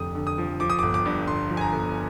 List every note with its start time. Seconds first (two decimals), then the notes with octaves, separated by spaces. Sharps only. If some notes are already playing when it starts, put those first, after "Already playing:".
Already playing: F1 F2 D3 F3 D#6
0.15 D3
0.27 D#6
0.38 F3
0.60 F3 D6
0.70 D#6
0.79 G1 D6
0.94 D6
1.06 G2
1.28 G1 C6
1.51 F3
1.57 G#5
1.61 A#5
1.73 G1